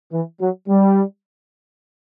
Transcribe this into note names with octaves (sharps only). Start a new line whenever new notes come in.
E3
F#3
G3